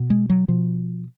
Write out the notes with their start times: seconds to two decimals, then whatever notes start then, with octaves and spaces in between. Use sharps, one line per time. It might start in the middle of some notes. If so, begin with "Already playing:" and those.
Already playing: B2
0.10 G#3
0.30 F#3
0.48 B2 F3